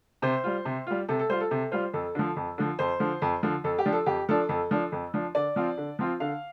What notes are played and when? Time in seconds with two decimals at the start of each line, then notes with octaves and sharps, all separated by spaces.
0.22 C3 C5
0.44 G3 F4
0.65 C3
0.87 G3 F4
1.08 C3 A4
1.19 A4
1.29 G3 F4 C5
1.40 A4
1.51 C3 A4
1.72 G3 F4 C5
1.94 F2 A4
2.15 D3 F3
2.36 F2
2.58 D3 F3
2.79 F2 C5
3.00 D3 F3
3.22 F2
3.43 D3 F3
3.64 F2 A4
3.78 G4
3.86 F3 D4
3.93 A4
4.06 F2 G4
4.29 F3 D4 A4
4.49 F2 A4
4.71 F3 D4
4.92 F2
5.14 F3 D4
5.35 D3 D5
5.56 F3 C4 F4
5.78 D3
5.99 F3 C4 F4
6.20 D3 F5